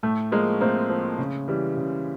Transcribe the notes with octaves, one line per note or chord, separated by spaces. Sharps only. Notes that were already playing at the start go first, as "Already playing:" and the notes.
A2 A3
F3 G#3 A#3
A2 A#3 C4
F3
C#3
E3 G3
C#3